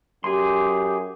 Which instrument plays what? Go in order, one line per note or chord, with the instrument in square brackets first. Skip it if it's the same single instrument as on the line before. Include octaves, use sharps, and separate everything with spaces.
[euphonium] F#2 [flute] G4 [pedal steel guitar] G#4 C6